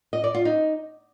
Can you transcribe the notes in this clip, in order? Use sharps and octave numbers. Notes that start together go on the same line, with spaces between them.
D#5
D5
F4
D#4